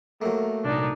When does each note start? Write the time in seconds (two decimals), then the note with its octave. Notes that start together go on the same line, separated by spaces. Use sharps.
0.22 F#3 A3 A#3
0.64 C2 A#2 D4 D#4